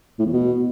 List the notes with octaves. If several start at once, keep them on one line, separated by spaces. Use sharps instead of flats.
A2
E2
B2